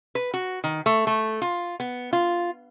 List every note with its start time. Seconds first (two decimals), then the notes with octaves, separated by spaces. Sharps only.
0.15 B4
0.34 F#4
0.64 D#3
0.86 A3
1.07 A3
1.42 F4
1.80 B3
2.13 F4